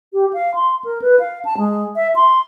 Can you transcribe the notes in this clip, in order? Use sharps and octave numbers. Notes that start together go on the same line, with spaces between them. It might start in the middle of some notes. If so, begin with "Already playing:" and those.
G4
F5
C6
A#4
B4
F5
A5
G#3
E5
C6